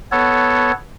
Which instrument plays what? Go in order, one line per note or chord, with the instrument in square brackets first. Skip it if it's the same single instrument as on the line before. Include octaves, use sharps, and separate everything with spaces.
[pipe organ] B3 A4 C#5